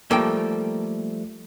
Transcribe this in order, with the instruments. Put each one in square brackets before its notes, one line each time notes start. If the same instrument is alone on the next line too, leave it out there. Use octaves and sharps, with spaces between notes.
[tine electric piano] F3 G3 A3 [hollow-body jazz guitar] A#3 A4 G5